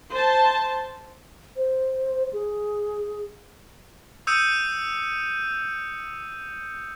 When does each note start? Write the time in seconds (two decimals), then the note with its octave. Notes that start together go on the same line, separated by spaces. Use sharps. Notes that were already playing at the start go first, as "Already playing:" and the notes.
0.12 C5 A5
1.56 C5
2.33 G#4
4.27 D#6 E6 G6 C#7 D#7